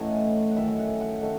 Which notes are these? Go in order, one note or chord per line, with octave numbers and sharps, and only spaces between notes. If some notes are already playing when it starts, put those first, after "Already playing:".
Already playing: A2 E3 A3 C#4 D#4 F#5 G#5
F#5
F#2 D#3 A3 E5
F#5
F#5
D#3 A3 C#4